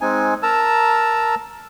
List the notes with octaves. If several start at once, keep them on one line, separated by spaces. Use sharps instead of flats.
G#3 C4 D#4 G#5
A#4 A5 A#5 E6